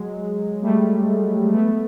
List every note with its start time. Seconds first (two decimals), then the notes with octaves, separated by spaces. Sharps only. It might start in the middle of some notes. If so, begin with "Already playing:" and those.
Already playing: F#3 G#3
0.62 G3 A3
1.53 A3 B3